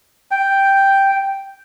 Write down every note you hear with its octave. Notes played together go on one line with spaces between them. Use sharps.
G5